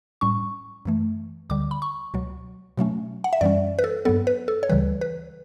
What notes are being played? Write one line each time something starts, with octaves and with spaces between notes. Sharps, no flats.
A2 G3 C#4 C#6
F#2 E3 A3
D2 D3 G3 D6
B5
C#6
C#2 B2 F#3
B2 F#3 A3 C#4
F#5
E5
F#2 E3 G3 C#4 D5
B4
A4
G2 F#3 B3 A4
B4
A4
C#5
D2 C#3 E3 G3 B4
B4